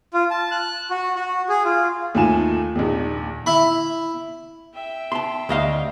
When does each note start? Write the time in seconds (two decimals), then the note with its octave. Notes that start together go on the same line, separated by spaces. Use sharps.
0.14 F4
0.31 A5
0.51 F#6
0.90 F#4
1.15 F#4
1.49 G#4
1.64 F4
2.15 D#2 A3 F4 G#5 E7
2.76 A#1 D#2
3.46 E4 B5
4.74 E5 G5
5.12 A5 C6
5.49 D2 D#5 F5